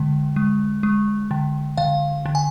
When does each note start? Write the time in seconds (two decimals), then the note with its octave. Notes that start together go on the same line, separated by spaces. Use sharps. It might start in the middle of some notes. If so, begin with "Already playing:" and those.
Already playing: D3 G#3
0.36 G#3
0.83 G#3
1.31 D3
1.77 D3 F5
2.26 D3
2.35 G#5